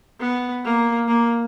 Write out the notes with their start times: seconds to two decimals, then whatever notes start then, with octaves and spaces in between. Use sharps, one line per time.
0.20 B3
0.64 A#3
1.08 A#3